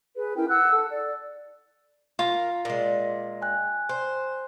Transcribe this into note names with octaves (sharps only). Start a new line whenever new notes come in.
G#4 B4
C#4 E4 A#4 G5
F#5 E6 F#6
A4
D5
F4 A#4
A#2 G#3
G5 G#5 F#6
C5